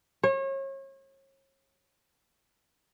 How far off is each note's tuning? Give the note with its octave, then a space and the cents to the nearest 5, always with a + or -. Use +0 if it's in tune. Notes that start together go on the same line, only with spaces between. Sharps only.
C#5 -35